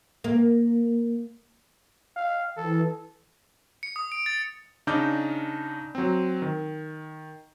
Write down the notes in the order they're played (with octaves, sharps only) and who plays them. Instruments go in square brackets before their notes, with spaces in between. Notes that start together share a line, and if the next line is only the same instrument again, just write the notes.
[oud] A#3
[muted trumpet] F5
[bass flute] E3 [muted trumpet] A4
[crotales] C#7
D#6
D7
A6
[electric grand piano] C#3 D4 D#4 D6 F6 G6
F#3 C4
D#3